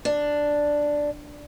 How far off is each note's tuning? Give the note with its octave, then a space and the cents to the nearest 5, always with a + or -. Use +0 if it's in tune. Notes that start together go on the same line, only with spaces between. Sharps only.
D4 +0